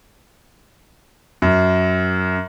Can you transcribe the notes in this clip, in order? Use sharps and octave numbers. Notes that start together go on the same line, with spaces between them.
F#2